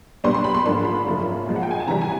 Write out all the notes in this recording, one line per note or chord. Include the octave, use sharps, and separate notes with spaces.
A#2 G3 B3 D4 C6
C6
B5
C6
G#2 F3 A#3 D4 C6
B5
F#2 C#3 F3 A#3
A#2 F3 G#3
F#5
G5
G#5
A5
C3 E3 G3 A#5
G#5